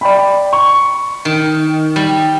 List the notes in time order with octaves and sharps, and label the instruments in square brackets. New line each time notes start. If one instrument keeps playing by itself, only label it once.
[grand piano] D5 G5 B5
C#6
[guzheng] D#3
G3